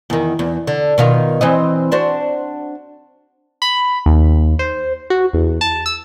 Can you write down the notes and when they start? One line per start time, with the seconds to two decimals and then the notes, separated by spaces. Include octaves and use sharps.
0.10 E2 D#3
0.39 E2
0.67 D3
0.98 B2 D#3 F4
1.41 E3 C4 D#5
1.92 D4 F#4 C5
3.62 B5
4.06 D#2
4.59 C5
5.10 F#4
5.33 E2
5.61 A5
5.86 E6